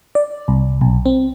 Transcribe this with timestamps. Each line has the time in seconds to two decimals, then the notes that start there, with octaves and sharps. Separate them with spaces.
0.15 D5
0.48 C2
0.81 B1
1.06 C4